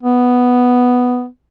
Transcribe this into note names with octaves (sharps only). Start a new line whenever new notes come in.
B3